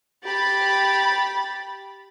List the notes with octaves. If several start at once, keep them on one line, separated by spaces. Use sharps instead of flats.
G4 B5 A6